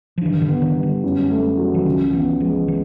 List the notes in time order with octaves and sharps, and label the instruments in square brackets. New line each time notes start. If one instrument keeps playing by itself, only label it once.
[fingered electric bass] F3
[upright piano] G2 [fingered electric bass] E3
[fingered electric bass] D#3
D3
[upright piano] B3
[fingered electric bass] D#3
[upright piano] G3
[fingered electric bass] D3
[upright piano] F#2
A3
F#3
[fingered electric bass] E3
[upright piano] C#2 [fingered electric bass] D#3
[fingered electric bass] E3 [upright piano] B3
[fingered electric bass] F3 [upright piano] G#3
[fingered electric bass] E3